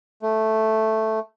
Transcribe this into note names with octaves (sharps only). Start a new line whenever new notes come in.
A3